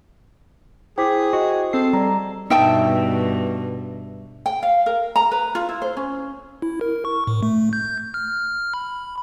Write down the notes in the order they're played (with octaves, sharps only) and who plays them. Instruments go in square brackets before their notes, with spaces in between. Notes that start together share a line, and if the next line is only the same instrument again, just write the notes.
[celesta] E4 D6 B6 [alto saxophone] G#4 [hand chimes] C5 G5
[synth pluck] F#4 [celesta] D#5
[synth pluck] C4 C7 [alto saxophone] A4
[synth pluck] G3 [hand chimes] D5 A#5
[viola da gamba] G2 B2 [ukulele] D#4 G5 A5 [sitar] E5
[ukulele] G5
F5
A#4
A#5
B4
F4
E4
C5
C#4
[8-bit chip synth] E4
A#4
C#6
A2
A3
G6
F6
B5